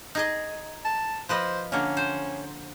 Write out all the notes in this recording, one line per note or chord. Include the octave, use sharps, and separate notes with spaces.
D#4 G#4 D#5
A5
F3 B4 C5 D#5
D3 A#3 C#4
C5